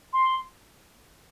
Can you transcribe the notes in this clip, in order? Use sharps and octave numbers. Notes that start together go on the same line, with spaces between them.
C6